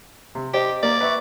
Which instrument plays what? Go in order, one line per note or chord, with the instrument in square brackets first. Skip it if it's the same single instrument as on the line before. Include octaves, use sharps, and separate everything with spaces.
[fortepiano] C3
[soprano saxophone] G4 [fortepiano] C5 D5 D#5
[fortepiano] A#3 [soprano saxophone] D5
[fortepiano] B4 E5 C#6